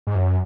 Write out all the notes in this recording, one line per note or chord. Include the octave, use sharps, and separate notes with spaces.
G#2
F#2